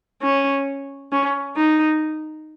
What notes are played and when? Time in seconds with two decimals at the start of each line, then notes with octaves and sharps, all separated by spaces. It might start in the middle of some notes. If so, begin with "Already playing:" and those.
0.22 C#4
1.12 C#4
1.56 D#4